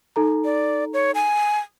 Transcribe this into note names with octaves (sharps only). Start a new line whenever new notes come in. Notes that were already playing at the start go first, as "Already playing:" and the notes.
D#4 A4 A#5
D5
C#5
G#5